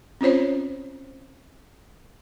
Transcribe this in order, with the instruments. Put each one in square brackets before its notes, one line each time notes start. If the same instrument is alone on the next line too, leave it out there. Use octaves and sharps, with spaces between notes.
[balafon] C4 C#4 F4 C5 C#5